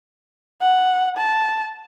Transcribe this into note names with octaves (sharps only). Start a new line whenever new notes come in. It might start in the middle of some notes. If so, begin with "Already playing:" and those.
F#5
A5